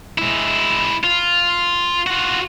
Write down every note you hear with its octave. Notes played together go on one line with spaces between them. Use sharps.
G#3 E4
F4
F4 F#4